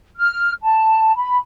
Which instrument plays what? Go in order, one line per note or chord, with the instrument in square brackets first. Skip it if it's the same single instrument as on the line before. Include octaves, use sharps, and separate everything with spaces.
[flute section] F6
A5
B5